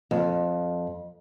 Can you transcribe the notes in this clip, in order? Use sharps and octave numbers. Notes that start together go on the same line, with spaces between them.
F2